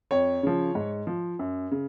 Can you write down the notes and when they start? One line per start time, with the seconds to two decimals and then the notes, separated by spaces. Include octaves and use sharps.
0.11 F2 C#5
0.43 C#3 F3
0.75 G#2
1.07 F3
1.39 F#2
1.71 C#3